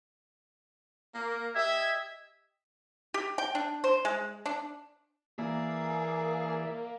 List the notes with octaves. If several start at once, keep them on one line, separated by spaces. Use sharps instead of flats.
A#3
G4 D#5 E5 G#6
G4
G5
D4
C5
G#3
D4
E3 A#3 G#4 D5 E5